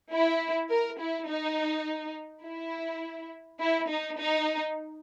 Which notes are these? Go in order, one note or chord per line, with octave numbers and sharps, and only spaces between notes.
E4
A#4
E4
D#4
E4
E4
D#4
D#4